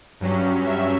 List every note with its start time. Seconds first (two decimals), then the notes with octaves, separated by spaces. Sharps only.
0.20 G2 F#3 C#4
0.66 E5